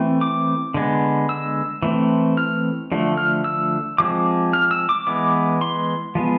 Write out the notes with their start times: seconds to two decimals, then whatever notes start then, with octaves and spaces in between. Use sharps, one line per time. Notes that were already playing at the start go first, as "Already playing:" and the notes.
Already playing: E3 A3 C4
0.21 D6
0.74 D3 G#3 B3
1.29 E6
1.82 E3 A3 C4
2.37 F6
2.92 D3 F3 A3
3.17 F6
3.44 E6
3.98 F3 G#3 C4 D6
4.53 F6
4.71 E6
4.89 D6
5.07 E3 G#3 B3 D6
5.61 C6
6.15 F3 G#3 B3